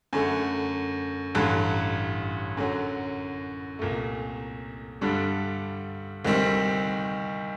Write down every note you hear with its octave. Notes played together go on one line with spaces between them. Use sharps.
F#2 D3 A3
A1 G2 D3
F#2 D3 F#3
C2 A#2 A3
G2 D3 G3 D4 A4
D2 C3 D#3 G3 C4